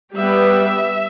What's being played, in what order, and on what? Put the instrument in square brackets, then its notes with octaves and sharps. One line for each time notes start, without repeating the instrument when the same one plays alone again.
[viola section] G3 B3 G4 B4 [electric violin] E5